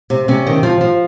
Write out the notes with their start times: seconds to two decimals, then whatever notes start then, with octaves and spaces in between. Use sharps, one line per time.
0.10 C3
0.28 C3 C#4
0.47 D#3
0.63 F3
0.81 F3